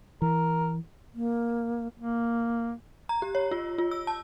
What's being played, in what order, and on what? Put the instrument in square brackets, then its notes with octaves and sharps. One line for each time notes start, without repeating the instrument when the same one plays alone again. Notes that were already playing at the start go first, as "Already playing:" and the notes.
[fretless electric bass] E3 [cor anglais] A#4
[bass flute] A#3
[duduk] A#3
[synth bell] A#5
G4
C#5
F4
F4
E6
A5